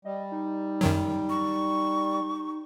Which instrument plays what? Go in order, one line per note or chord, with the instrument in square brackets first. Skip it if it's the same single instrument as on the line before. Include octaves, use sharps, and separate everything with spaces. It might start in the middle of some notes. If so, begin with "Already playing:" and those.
[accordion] G3 [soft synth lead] D#5
[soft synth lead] D#4
[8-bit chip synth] F#2 D#3 F#3
[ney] C#6